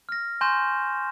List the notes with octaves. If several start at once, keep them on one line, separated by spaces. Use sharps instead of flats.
F6 A#6
G#5 C6 C#6 G6 A#6 E7